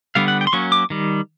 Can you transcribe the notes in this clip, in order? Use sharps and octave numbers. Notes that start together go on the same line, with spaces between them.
D3 G3 B3 F5
F#5
G5
C6
F#3 A#3 C#4 C#6
D6
D#3 G3